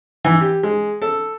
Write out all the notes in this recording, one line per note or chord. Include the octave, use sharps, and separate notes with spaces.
E3
G4
G#3
A4